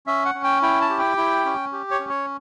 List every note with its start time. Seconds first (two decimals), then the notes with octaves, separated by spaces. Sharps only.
0.07 C#4 E5
0.25 F#5
0.35 C#4
0.44 G5
0.62 E4 G5
0.81 A5
0.90 G4
0.99 G5
1.17 E4
1.45 C#4
1.72 G4
1.91 C#5
2.00 C#4
2.09 C#5